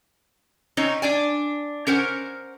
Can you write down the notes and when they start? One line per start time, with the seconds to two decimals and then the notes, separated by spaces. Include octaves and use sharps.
0.77 C4 C#4 D#4 C#5
1.02 D4 D5 G#5
1.87 C#4 A#4 C5 F#5